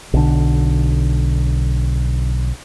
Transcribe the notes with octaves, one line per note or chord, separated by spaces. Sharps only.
B1 D3